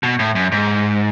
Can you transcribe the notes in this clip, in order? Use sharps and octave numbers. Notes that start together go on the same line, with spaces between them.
B2
A2
F#2
G#2